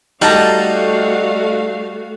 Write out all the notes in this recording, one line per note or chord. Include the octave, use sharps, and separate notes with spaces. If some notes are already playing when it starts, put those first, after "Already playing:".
G3 A3 D#4 F#4 F5 F#5 A5 A#5